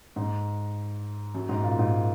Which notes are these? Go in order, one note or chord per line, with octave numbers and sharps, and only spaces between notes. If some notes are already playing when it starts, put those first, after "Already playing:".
G#2
F#2
G#2
A#2
G#2